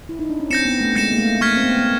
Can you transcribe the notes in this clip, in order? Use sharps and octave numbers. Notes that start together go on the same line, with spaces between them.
E4
D#4
D4
C#4
C4 G6 A#6 C#7 E7
B3
A3
G#3 G6 A#6 C#7 E7
A#3
A3
A#3 C#6 F6 G#6 B6
C4
B3
B3